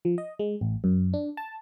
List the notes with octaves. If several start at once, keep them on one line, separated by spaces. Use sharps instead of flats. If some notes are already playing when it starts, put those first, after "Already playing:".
F3
D#5
G#3
A1
F#2
D4
A5